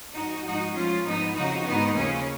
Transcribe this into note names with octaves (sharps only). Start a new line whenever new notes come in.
G#2 F3 D#4 F#4
G#2 F3 D#4 F#4
G#2 F3 C#4 F4
G#2 F3 B3 D#4
F2 C#3 F3 D#4 F#4
G#2 D#3 B3 D#4
D#2 C#3 F3 A#3 C#4